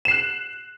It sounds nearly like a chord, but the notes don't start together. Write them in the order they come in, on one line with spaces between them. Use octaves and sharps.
E7 C7 F#6